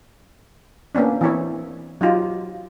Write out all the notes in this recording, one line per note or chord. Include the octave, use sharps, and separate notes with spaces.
A#3 B3 C#4 D4
E3 B3 C4 E4 A#4 C#5
F#3 D#4 F4 G4